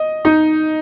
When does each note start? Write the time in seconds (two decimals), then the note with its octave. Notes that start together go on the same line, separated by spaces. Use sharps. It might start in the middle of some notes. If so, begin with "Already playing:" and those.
Already playing: D#5
0.25 D#4